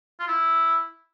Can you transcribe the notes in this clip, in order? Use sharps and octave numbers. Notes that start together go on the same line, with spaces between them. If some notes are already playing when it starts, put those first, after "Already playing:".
F4
E4